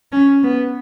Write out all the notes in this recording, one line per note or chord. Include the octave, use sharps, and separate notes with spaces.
C#4
B3